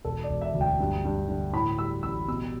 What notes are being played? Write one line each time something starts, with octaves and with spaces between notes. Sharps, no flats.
E1 A4
D5
E1
E5
D2
G5
G2
G2
D3
A2 B5
G3 E6
A1 E6
B2 E6